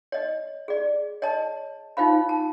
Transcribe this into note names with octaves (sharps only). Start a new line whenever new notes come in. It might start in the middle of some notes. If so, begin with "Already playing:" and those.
C#5 D#5
G#4 D5
C#5 D#5 A5
D#4 F4 C5 F5 B5
A5